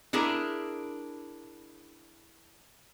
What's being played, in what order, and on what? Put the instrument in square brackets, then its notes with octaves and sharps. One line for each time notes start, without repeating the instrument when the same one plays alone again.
[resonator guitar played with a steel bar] D4 E4 G#4 A#4